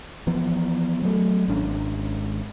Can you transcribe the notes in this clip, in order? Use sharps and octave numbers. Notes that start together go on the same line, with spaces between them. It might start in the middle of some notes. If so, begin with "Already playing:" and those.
E3 F3 B3
F#3 A3
G#1 C#4 D4